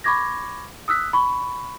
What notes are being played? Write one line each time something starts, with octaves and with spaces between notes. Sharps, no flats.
B5 C#6 D6 G#6 A#6
D#6 E6 F#6 B6
B5 C#6